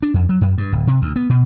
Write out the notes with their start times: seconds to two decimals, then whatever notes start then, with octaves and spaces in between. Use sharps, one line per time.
0.03 D4
0.14 F2
0.29 F#3
0.41 F#2
0.58 G2
0.72 D1
0.87 C3
1.02 D2
1.16 B3
1.30 B2